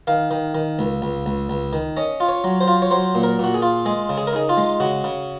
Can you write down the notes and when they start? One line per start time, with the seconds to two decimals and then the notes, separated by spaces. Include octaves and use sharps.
0.07 D#3 F5
0.31 D#3
0.55 D#3
0.79 C#2
1.02 C#2
1.26 C#2
1.49 C#2
1.73 D#3
1.97 C#4 D#5
2.20 F4
2.29 C#5
2.44 F#3
2.60 C5
2.68 F4
2.82 C#5
2.91 F#3 C5
3.15 A#2
3.23 A#4
3.39 A#2 F#4
3.54 G#4
3.62 F4
3.86 G#3 G#4
4.09 C#3
4.17 G#4
4.27 A#4
4.33 D#4 G#4
4.49 F4
4.57 G#3
4.80 C#3 F#4
5.04 C#3